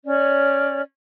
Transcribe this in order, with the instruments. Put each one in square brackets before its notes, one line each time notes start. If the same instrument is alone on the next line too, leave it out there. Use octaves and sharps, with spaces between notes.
[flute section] C#4 C#5 D5